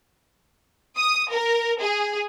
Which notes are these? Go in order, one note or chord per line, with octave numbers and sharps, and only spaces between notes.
D#6
A#4
G#4